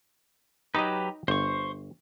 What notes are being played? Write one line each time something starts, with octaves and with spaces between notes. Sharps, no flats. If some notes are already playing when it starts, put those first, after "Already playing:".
F#3 D#4 G4 B4 D#5
G1 C5 C#6